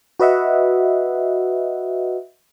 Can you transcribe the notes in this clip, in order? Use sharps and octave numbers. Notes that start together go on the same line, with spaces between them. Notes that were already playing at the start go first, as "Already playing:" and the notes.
F#4 B4 D#5 E5 F#5